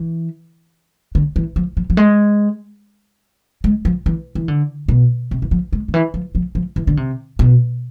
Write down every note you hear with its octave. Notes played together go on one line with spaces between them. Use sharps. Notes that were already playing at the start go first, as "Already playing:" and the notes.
Already playing: E3
D3
E3
F3
F3
F3
G#3
G#3
F3
E3
E3
D3
B2
C3
E3
F3
G#3
D3
E3
F3
F3
F3
E3
D3
C3
B2